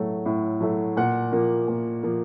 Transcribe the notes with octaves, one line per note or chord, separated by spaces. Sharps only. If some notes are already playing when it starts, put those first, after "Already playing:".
Already playing: A2 F#3 A3
A2
F#3 A3
A#2 F#5
F3 A#3
A#2
F3 A#3